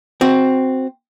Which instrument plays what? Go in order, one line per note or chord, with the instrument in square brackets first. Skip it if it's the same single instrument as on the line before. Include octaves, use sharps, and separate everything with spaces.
[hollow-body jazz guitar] C4 F#4